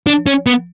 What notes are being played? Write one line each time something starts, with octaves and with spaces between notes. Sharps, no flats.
D4
C#4
B3